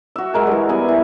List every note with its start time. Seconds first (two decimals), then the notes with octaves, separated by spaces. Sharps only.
0.16 F#4 E5
0.34 G#3 A#4 G#5
0.47 E3 G3
0.69 B3 G#5
0.88 E3